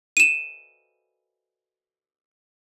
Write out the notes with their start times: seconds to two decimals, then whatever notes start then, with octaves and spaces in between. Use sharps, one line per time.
0.17 D#7 E7